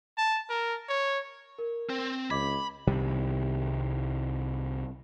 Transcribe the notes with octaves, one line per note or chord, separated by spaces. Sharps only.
A5
A#4
C#5
A#4
C4
C#2 D#5 B5 D6 G#6
C2 C3 D#3 G3